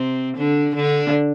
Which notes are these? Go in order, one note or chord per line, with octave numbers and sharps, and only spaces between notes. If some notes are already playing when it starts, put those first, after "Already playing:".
Already playing: C3 C4
D3 D4
D3 D4